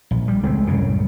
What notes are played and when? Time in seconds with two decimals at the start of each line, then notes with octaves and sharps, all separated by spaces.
0.11 A#1
0.28 G3
0.43 C#2 G#3 A3 C4
0.67 C2 F#2 A2 C#3